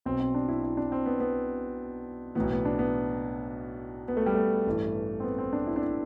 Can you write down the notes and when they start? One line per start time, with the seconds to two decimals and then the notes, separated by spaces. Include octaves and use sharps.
0.06 B1 B2 C4
0.20 C4
0.34 D4
0.48 E4
0.63 E4
0.77 D4
0.92 C4
1.06 B3
1.20 B3
2.35 B1 A2 E3 B3
2.51 B3
2.65 D4
2.79 B3
4.08 B3
4.17 A3
4.26 G3
4.34 A3
4.66 A1 G2 E3
5.20 C4
5.23 B3
5.38 C4
5.53 D4
5.67 E4
5.76 D4
5.81 E4